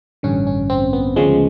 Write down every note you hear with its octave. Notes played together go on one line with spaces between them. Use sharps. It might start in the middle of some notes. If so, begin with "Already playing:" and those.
A1 G2 D3 C#4
C#4
C4
B3
D2 C#3 F3 G#3